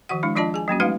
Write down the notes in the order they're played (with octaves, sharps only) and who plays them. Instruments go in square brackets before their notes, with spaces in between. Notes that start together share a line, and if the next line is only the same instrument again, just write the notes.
[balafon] D#3 F3 F#4 F#5
G#3 D4 E4
F3 D4 F4 D5 D#5 A5
G#4 G#5
F#3 A#3 C#4 F#4
G#3 A3 D#4 F#4 B4 F5